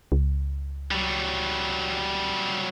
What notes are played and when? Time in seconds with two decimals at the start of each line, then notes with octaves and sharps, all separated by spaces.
0.12 C#2
0.91 F#3 G3